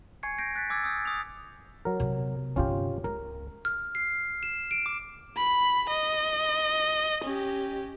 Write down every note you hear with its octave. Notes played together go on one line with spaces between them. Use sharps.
G#5 C#6 G#6 C7 C#7
G6 A#6 C7 D7
F#6 A6 B6
G#5 D6 E6 G#6 A6
D#6 E6 G6
D#6 F7
F#3 A#4
C3 B3
G1 C3 C#4 F4 G4
C#2 A#4
F6
C7
E7
D7
D6
B5
D#5
C#4 G4